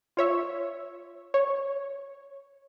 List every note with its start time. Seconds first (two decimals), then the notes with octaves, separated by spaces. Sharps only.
0.17 F4 C#5 E5
1.34 C#5